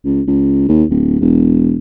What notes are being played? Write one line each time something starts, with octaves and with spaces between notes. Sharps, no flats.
C#2
C#2
D#2
D1
E1